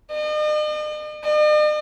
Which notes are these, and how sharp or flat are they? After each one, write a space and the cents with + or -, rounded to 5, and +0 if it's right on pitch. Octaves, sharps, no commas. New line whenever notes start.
D#5 -45
D#5 -45